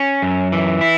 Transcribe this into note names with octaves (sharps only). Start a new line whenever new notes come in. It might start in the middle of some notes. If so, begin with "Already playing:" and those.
Already playing: C#4
F#2
E3
E4